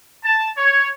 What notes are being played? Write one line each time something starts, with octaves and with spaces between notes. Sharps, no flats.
A5
C#5